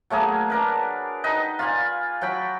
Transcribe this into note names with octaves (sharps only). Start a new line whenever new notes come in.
F#3 A3 A#3 G#4
D4 A#4 B4
D#4 B4 D#5 G5
F4 D5 F5 G#5
F#3 F#4 G5 B5